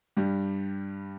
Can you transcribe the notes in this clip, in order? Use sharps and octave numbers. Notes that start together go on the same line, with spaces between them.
G2 G3